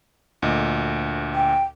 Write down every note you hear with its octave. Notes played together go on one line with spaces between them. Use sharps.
D2 A#2 D#5
G5